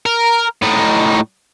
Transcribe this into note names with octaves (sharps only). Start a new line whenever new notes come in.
A#4
A2 D#4